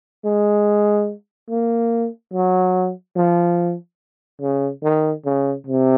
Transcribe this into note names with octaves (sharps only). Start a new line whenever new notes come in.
G#3
A#3
F#3
F3
C#3
D#3
C#3
C3